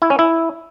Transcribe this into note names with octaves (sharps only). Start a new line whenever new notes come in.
E4
C#4
E4